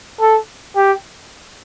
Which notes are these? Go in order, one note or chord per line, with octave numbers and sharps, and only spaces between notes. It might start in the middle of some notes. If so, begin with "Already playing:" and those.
A4
G4